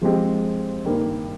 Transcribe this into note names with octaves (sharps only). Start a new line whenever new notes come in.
F3 G#3 C4 G4
G2 D#3 G3 A#3